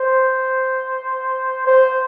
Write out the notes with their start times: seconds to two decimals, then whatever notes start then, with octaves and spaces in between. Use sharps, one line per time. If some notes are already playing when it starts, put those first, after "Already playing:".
Already playing: C5
1.67 C5